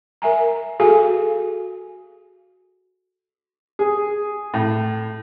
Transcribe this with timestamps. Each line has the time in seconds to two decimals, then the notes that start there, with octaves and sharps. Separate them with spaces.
0.22 A#4 E5 G#5 A#5
0.80 F#4 G#4 A4 F5 G#5
3.79 G#4
4.54 A2